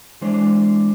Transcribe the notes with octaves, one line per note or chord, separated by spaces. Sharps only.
E3 G#3 D4 C5